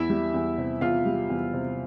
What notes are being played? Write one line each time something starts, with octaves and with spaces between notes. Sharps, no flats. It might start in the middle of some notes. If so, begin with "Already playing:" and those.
Already playing: E2 E4 E5
G3
E2
C3
E2 F4 F5
G3
E2
C3